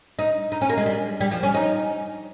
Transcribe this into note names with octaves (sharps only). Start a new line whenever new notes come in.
D#4
D#4
C#4
A#3
G#3
G3
G3
F3
C#4
D#4